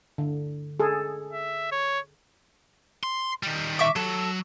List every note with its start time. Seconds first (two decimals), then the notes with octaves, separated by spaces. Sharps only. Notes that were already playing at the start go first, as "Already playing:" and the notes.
0.18 D3
0.80 G#4 A4
1.33 E5
1.72 C#5
3.03 C6
3.43 D#3 G3
3.79 E5 C#6 D6
3.96 F#3 A4